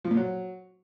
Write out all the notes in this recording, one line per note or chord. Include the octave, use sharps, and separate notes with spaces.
F3
A#2
F#3